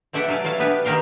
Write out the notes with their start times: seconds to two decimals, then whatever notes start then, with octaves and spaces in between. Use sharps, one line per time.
0.13 B2 A3 D5 E5 F#5 G5
0.27 F#3 G4 F5 G#5 A5
0.44 B2 A3 C#5 F5 A5
0.59 B3 D4 G4 B4 G#5
0.85 B2 D#3 G4 A#4 F5 G5